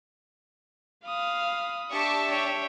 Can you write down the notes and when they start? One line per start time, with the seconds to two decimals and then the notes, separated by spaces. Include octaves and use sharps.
1.06 F5 B5 D#6
1.92 D4 G4 E5 A5 C#6
2.30 C#5 G5